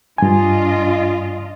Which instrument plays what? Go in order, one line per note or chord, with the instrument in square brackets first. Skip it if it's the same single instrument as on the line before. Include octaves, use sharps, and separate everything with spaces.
[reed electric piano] G2 G#5 [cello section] D4 F4 D#5